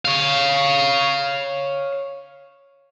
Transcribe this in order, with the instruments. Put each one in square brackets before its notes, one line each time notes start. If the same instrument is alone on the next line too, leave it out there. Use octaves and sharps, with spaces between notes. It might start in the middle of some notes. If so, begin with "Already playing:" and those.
[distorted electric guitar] C#5 F5